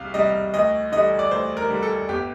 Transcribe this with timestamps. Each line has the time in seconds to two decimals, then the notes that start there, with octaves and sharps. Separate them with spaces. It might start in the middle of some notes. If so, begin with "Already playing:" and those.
Already playing: C2 C3 G3 F5
0.14 C3 G3 D#5
0.54 D2 D#5
0.92 D3 G3 D#5
1.19 D5
1.31 D2 C5
1.57 A#4
1.70 D3 G3
1.83 A4
2.09 G1 G4